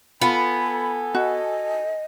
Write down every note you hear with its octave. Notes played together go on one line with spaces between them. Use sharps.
B3 F4 A4 G#5 B5
F#4 D#5